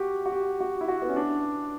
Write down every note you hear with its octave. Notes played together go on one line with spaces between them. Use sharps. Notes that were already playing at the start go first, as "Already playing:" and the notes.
Already playing: F#4 G4
F#4
G4
F#4
E4
F#4
B3
C#4
D4